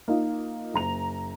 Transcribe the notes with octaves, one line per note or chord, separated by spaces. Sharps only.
A#3 D#4 F4
F#1 A#5 F7